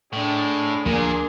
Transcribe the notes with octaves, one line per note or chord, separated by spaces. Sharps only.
A2 G#3 D4
D2 A#2 F3 A#3 D4 G#4 A#4